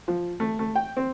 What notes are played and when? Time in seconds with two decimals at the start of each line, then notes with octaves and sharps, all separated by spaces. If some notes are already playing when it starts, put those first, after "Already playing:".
0.08 F3
0.40 A3
0.59 A3
0.75 G5
0.97 C4